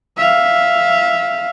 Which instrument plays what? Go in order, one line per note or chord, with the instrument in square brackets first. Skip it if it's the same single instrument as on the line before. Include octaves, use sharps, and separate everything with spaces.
[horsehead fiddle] E5 F5